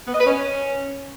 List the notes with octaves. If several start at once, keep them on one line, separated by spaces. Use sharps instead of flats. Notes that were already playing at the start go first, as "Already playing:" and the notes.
B3
D#5
B4
C#4